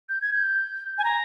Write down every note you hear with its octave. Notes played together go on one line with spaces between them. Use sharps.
G6
G#6
G6
G#5
A#5